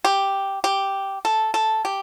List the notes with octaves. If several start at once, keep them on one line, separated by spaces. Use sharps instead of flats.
G4
G4
A4
A4
G4